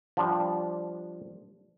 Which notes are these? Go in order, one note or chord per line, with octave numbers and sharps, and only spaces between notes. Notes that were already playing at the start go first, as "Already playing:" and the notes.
F3 G3 D4